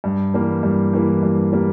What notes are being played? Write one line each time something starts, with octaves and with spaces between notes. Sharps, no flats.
G2
E3 G3 A#3
G2
E3 G3 A#3
G2
E3 G3 A#3